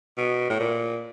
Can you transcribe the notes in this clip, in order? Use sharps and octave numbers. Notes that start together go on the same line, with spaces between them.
B2
A2
A#2